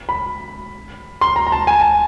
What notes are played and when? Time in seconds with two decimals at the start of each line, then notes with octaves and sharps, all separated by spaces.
0.09 B5
1.21 C6
1.36 A#5
1.47 A#5
1.52 A5
1.67 G#5
1.81 A5